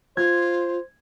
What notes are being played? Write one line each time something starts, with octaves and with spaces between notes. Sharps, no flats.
F4 C5 G#6